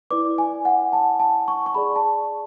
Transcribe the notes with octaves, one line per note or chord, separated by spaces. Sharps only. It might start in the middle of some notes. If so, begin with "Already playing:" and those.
E4 B4 D5 D6
G#5
F#5
A5
A5
C#6
C#6
G#4 D5 B5
A5